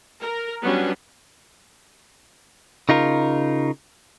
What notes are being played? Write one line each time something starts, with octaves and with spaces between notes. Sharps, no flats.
A#4
F#3 G3 B3 C#4 D4
C#3 D#4 F4 A#4